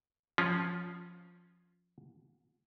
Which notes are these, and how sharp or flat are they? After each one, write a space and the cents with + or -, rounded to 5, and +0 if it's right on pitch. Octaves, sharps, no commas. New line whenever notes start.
F3 +10 C#4 +0 F4 +0